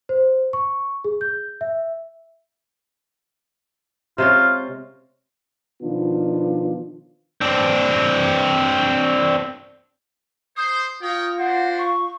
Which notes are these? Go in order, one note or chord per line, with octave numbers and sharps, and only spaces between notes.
C5
C#6
G#4
G6
E5
C3 G#3 C#4 F4
B2 D#3 F3 B3 D4 F4
C4 D4
C5 D#6
F4 A#4 C#5 G5 D#6
D4 F#4 C5 F#5
C#6